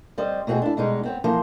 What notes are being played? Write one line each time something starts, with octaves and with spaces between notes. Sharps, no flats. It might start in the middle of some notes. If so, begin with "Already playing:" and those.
G3 C4 D#5
B2 A3 C4 F#4 G#4
D4 E4
B2 G3 G#3 D#4
B3 C4 C#5
E3 F3 A#3 C5